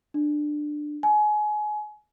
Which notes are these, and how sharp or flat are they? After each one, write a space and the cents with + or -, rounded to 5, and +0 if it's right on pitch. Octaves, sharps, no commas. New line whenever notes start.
D4 +15
G#5 +25